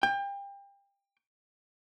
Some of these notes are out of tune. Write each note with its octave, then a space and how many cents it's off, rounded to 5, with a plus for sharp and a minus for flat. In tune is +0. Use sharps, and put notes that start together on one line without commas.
G5 +30